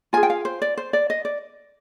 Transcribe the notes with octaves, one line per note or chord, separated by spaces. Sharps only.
F4 G#4 G#5
G5
F5
C5
D5
C5
D5
D#5
D5